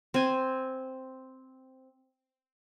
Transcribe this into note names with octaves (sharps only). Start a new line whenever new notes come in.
C4 G#5